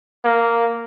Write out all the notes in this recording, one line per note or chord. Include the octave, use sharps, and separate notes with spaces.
A#3